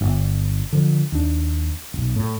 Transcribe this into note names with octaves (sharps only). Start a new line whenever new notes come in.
G1
D3 F3
D#2 D4
D1 B1
A2